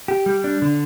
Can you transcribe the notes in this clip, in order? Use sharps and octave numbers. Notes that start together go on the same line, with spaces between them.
G4
G3
D4
D3